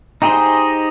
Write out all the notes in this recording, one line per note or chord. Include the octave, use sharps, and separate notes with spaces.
D#4 G4 G#4 C5 D#5